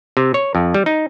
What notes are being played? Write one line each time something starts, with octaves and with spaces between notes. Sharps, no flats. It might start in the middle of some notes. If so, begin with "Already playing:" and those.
C3
C#5
F2
G3
D#4